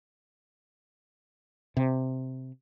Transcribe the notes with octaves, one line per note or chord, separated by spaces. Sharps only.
C3